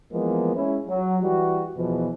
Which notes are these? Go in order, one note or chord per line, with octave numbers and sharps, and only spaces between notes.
E3 F3 G#3 A#3 B3
G#3 C#4 E4
F#3
E3 G3 F#4
E2 B2 E3 F3